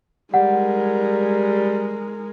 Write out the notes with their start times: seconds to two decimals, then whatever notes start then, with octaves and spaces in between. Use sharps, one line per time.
0.34 G3 G#3 A#4 F#5